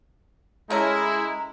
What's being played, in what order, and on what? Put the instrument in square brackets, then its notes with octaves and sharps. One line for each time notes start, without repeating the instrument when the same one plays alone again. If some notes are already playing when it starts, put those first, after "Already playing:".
[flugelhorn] G#3 [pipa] A3 C#4 A#4 [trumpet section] E4 [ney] A#5